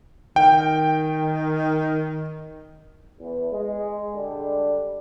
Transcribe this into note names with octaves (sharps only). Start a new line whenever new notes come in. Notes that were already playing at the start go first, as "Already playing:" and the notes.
D#3 G5
E2
G#3
D3 G3 D4